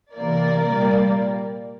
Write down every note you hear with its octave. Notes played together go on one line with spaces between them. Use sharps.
C3 E3 A#3 A#4 D5
A#2 G3 A#3